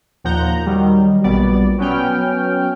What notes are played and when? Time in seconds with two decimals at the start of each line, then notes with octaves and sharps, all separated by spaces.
0.24 D#2 A#2 F3 F#5 A#5 G6
0.66 D#3 F#3 G3
1.24 A#1 B2 G3 B3 D5
1.78 F#3 B3 C#4 G5 F6